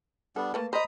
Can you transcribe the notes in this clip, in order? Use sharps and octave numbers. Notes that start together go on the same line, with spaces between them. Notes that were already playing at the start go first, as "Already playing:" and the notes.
G3 B3 D4 A4
A3 A#3 B4 A5
C5 D#5 A#5 B5 D#6